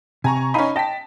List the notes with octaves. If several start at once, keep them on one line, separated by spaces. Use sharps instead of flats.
C3 G#5 A#5 C#6
C#4 D#4 F5 G#5 B5
D#5 G5 A5 B6